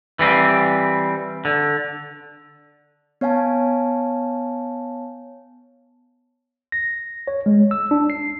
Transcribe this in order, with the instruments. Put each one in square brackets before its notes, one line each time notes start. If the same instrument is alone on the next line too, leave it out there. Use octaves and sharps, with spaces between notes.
[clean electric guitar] E3 G3 C4
D3
[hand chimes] B3 C#5 F5 G#5 A5
[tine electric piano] A#6
C#5
G#3
E6
D4
C7